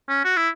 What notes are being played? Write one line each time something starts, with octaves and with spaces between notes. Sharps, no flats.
C#4
F#4
E4